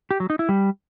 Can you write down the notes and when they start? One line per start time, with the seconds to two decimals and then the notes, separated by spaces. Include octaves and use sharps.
0.11 G4
0.20 F#3
0.30 D#4
0.39 E4
0.49 G3